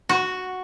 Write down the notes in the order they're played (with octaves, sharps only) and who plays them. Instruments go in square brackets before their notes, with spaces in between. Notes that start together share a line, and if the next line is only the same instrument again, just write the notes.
[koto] F#4